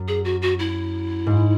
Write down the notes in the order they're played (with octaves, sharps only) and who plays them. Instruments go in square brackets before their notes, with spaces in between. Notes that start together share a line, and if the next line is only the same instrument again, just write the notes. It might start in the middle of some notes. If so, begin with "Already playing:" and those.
Already playing: [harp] F#2
[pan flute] G#4
F#4
F#4
E4
[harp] G#2